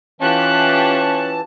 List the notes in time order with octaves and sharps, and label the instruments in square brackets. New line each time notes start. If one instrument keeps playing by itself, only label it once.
[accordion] E3 A5 [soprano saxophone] C#4 [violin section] F4 G4 F#6